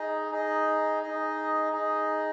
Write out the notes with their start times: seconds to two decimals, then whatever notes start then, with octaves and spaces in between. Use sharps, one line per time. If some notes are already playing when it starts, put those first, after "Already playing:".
Already playing: D#4 G#4 D#5
0.31 D#4 G#4 D#5
1.03 D#4 G#4 D#5
1.72 D#4 G#4 D#5